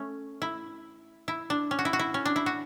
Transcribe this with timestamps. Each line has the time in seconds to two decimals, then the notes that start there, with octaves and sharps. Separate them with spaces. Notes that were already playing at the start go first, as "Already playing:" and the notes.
Already playing: A3 C#4
0.42 E4
1.28 E4
1.50 D4
1.71 C#4
1.79 F#4
1.85 E4
1.93 F#4
1.99 E4
2.14 C#4
2.25 D4
2.36 E4
2.46 F#4